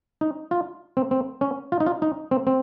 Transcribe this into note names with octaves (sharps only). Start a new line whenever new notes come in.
D#4
F4
C4
C4
C#4
F4
D#4
F4
D#4
C4
C4